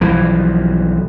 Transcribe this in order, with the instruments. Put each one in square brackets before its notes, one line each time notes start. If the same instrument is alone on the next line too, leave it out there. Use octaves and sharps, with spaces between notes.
[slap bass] B1 E3 F3